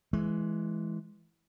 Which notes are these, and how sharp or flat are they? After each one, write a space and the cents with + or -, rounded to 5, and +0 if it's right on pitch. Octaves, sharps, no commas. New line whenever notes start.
E3 +0 G#3 +15